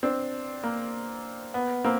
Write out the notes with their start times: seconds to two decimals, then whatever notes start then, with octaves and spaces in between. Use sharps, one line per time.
0.03 C4 D4
0.64 A#3
1.54 B3
1.84 A#3 C4